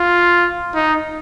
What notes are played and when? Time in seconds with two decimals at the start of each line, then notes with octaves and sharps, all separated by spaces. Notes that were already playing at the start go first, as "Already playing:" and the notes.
Already playing: F4
0.75 D#4